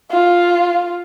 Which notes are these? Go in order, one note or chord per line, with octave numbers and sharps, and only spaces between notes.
F4